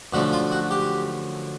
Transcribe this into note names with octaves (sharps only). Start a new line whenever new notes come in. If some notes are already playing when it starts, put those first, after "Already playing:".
F#2 D3 F3 A3 F#4
F4
F#4
G4